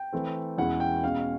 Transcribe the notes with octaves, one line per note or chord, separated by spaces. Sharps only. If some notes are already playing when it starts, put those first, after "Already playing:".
Already playing: G5
E3 A3 C4
E2 B2 G#3 C#4 E4 F#5
G5
B2 G#3 C#4 F5